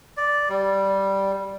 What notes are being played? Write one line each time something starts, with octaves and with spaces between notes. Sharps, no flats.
D5
G3